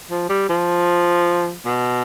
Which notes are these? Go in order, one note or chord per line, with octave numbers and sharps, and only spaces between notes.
F3
G3
F3
B2